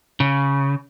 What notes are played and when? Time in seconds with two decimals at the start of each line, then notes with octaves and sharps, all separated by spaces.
0.20 C#3